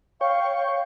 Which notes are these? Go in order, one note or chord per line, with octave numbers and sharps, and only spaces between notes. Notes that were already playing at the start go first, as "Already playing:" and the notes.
C#5 F5 G5 C#6